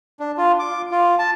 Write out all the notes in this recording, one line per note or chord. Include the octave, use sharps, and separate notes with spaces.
D4
F4
D6
F4
A5